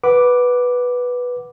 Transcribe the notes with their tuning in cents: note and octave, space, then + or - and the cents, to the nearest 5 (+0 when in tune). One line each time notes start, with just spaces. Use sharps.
B4 -5 F#5 +0 D6 +0